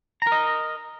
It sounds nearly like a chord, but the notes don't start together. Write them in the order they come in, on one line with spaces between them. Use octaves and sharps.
A#5 A#4 D#5